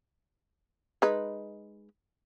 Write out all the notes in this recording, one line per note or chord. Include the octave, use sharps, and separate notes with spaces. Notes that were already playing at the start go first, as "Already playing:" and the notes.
G#3 D#4 B4